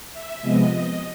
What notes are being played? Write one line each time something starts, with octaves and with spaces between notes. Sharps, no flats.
E5
C3 F3 G#3 B3 D#5